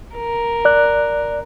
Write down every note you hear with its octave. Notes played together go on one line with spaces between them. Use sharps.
A#4
D5 F#6